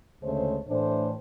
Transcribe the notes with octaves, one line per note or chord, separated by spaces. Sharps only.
D2 C#3 G#3 A3 C5 C#5
A2 E3 A3 D4 C5